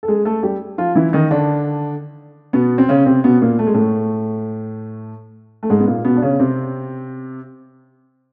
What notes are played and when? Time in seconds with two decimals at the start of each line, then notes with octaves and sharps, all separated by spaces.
0.03 A4
0.08 G#3 G#4
0.25 A3 A4
0.43 G3 G4
0.78 F3 F4
0.95 E3 E4
1.13 D#3 D#4
1.31 D3 D4
2.53 B2 B3
2.78 C4
2.89 C#3 C#4
3.06 C3 C4
3.24 B2 B3
3.42 A#2 A#3
3.59 A3
3.67 G#3
3.74 A2 A3
5.63 A3
5.70 G#2 G#3
5.80 B3
5.87 A#2 A#3
6.05 B2 B3
6.17 D4
6.22 C#3 C#4
6.40 C3 C4